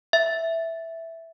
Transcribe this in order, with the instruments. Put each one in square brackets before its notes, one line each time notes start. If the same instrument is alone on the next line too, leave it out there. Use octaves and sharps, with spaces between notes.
[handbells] E5